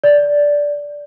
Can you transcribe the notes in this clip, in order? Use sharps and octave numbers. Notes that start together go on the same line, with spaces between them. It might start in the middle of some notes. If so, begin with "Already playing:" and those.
D5